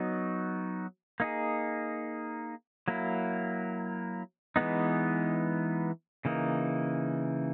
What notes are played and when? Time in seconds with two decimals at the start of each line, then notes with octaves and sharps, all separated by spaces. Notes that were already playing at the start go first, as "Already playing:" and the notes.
Already playing: F#3 B3 D#4 F#4
1.20 A#3 D#4 G#4
2.88 F#3 A#3 E4
4.56 E3 G#3 B3 D#4
6.25 C#3 E3 A#3 D#4